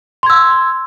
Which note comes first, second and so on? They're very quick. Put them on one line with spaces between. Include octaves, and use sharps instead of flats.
C6 G#6 E6